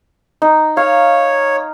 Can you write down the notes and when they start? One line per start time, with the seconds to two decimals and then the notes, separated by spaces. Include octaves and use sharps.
0.42 D#4
0.77 C#5 F5